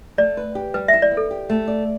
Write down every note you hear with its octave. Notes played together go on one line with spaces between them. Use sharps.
A3 D5
B4
G4
G3 B4
E5
E4
D5
B3
A4
G4
A3
D5